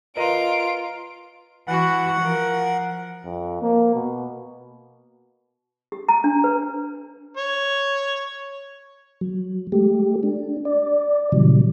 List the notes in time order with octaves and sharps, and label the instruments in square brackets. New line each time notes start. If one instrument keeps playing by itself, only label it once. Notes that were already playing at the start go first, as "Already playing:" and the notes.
[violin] F4 D7 [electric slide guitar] A#4 B4 D#5
[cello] E3 F#4 [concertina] F#5
[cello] F3 A#4
[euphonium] F2
A#3
B2
[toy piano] G4
A#5
D4
B4
[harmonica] C#5
[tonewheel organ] F#3
G#3 A3 G4
D4
D5
A#2 C#3 E3 F#3 G3